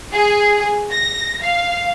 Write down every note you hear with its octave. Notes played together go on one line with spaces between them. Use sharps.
G#4
A#6
F5